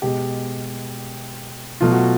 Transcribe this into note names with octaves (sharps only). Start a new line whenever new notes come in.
B2 G#3 G4
B2 F#3 A3 F4
F#4